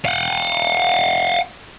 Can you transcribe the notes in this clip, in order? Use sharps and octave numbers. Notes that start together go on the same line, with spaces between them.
F5 F#5